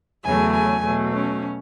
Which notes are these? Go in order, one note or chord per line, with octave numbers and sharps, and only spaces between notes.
E2 C#3 F#3 A3 G#5
G#5
B2 F#3 A3
C#4